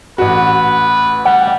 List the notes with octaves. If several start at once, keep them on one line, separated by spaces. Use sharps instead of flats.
A1 F#4 B4
G3 F#5